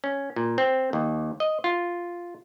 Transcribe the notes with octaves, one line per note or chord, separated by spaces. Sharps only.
C#4
A#2
C4
D#2
D#5
F4